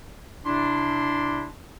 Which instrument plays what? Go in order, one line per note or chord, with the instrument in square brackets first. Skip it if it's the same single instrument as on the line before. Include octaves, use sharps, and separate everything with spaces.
[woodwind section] C3 D4 E4 C6